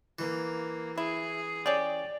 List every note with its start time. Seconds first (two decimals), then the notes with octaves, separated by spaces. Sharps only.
0.19 E3 A#3
0.98 E4 G#4
1.66 C#4 G4 D5